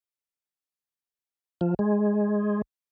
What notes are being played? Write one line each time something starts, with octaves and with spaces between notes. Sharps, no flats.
F3
G#3